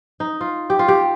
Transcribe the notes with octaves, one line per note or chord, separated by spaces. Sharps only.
D#4
F4
G4
F4
G4